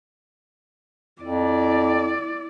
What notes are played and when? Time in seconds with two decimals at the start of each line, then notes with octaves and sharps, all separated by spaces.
1.22 F2 E4 D5